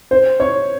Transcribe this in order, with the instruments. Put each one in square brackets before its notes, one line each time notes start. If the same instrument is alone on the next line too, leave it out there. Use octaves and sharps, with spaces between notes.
[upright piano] C5
C#5